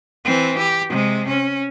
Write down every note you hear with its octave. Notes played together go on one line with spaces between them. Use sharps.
E3 C4
G4
C3 G#3
C#4